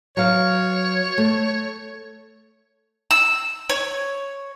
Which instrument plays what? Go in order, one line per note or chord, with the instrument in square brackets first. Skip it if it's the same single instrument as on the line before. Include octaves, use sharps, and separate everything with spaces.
[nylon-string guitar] F#3 F5 [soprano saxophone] C#5
[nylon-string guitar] A3
[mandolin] E6
C#5